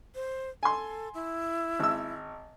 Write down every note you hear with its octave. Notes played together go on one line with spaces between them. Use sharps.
C5
A4 G#5 C6
E4
G#1 E6